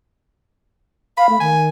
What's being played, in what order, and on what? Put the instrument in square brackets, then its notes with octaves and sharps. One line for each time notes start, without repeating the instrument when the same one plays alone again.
[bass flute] F5 [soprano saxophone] B5
[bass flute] A3
[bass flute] D#3 [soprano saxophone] G#5